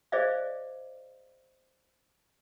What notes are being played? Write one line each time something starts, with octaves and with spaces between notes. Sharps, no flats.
G#4 C5 D5 D#5 F5